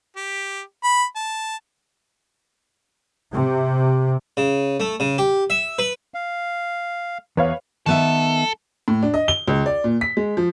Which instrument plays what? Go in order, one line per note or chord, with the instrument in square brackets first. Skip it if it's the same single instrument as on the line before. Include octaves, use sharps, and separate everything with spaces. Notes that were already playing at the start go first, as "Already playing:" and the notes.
[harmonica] G4
B5
A5
[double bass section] C3
[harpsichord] C#3
A3
C#3
G4
E5
B4
[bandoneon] F5
[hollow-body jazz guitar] E2 [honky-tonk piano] B4 C#5 F5
[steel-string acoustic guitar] D#3 B3 E5 [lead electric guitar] A4
[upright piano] A2
D4
D#5
G7
C#2
D5
A#2
B6
G#3
F3